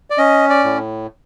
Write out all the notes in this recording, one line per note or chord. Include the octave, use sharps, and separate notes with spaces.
D5
C#4 D#5
D5
A2